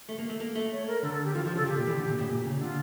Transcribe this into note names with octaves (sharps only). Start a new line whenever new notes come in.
A3
A#3
A3
A#3
A3
C#5
A#4
D3 A4
A4
G4
E3 F4
F3 F4
C#3 A4
C#3 G4
A#2
E3
D3
A#2
A2
A#2
C#3
D3 F4